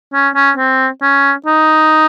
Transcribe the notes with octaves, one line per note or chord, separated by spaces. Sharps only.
C#4
C#4
C4
C#4
D#4